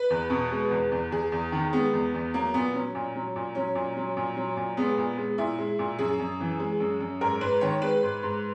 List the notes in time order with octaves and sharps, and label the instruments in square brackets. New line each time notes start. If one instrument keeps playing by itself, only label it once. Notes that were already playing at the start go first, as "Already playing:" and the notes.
Already playing: [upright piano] B4
E2
B2
G#3
E2
E2
E2 G#4
E2
D#3
G#3 B3
E2
E2
F#3 A#3
A#2 B3
F#3 C#4
A#2
F#3
A#2
F#3 C#4
A#2
F#3
A#2
F#3
A#2
G#3 B3
A#2
G#3
A#2 E4
G#3
A#2
F#2 G#4
F#2
E3
G#3
F#2
F#2
G#2 A#4
G#2 B4
D#3 C#5
G#3 B4
G#2
G#2